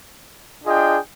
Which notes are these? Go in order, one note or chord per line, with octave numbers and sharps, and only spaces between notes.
D4 F4 G#4 D#5 G5